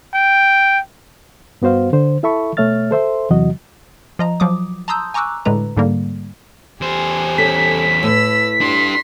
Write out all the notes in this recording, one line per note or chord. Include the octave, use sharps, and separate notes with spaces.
G5
G2 B3 F#4 C5 F5
D3 C5
E4 A4 E5 A5 B5 C#6
B2 A3 C#5 E5 F6 A6
A4 C5 E5 C6
E2 C3 E3 F#3 F#4 D#5
F3 D#5 A#5
F3 F#3 D6 D#6
A5 A#5 C6 D#6 E6 G6
G#5 A#5 C#6 D6 E6 F#6
A2 D3 G#3 B4 A#5
G#2 D3 G3 A#3
E2 G4 C5 G#5
C#4 A4 B6
A2 B4 E6
D4 G4 C6